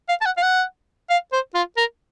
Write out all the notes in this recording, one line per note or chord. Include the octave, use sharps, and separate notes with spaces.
F5
A5
F#5
F5
F#5
F5
C5
F4
A#4